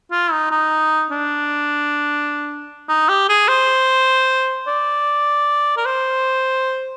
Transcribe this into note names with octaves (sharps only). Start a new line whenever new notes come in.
F4
D#4
D#4
D4
D#4
G4
G#4
C5
D5
A#4
C5